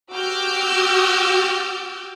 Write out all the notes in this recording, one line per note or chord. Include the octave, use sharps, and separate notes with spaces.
F#4 G4 D6 E6 F6 G6